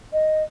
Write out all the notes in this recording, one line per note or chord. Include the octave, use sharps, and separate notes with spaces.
D#5